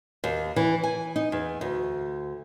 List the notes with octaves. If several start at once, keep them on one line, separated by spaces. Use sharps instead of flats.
D#2
E3
G#5
D#4
E2
D2